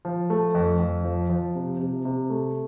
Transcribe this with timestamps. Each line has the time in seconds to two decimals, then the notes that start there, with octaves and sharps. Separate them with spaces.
0.05 F3
0.30 A3
0.55 F2
0.80 F2
1.04 F3
1.29 F3
1.55 C3
1.80 C3
2.05 C3
2.30 A3